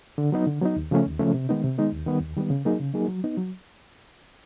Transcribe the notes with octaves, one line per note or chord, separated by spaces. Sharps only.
D3
F#3 B3 D#4
D3
F#3 B3 D#4
D#2
C#3 F3 A3 C#4
D#2
C#3 F3 A3 C#4
C3
D#3 G#3 B3 D#4
C3
D#3 G#3 B3 D#4
D#2
D#3 G3 B3
D#2
D#3 G3 B3
C#3
F#3 A#3 D#4 G#4
C#3
F#3 A#3 D#4 G#4
F#3
B3 D#4
F#3